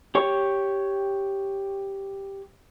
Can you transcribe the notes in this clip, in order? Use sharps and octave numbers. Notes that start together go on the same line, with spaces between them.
G4 C#5 C#6